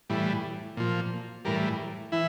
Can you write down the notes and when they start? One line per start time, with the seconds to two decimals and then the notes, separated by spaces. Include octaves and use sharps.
0.10 A2 E3 G3
0.77 A#2 F3
1.45 A2 E3 G3 A#4
2.12 E3 E4